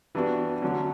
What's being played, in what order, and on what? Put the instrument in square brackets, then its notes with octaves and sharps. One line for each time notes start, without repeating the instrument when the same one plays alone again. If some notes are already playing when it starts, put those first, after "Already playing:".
[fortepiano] E3 G3 B3 D4 F#4
D3 F#3 A3 C#4